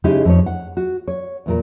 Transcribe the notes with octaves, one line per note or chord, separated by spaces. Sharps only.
C#3 G#3 D#4 E4 G4
F2 D#4 C#5
F#5
F#4
C#5
E2 A#2 A#4